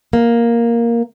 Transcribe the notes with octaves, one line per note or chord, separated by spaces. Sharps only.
A#3